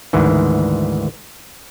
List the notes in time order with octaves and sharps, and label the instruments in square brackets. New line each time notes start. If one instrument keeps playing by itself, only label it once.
[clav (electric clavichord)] D2 G#2 D#3 E3